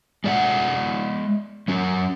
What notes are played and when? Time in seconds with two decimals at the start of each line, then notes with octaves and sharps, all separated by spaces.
0.24 G#3 D5 E5 F#5
1.68 F#3 C#4